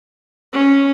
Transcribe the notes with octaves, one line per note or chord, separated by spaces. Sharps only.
C#4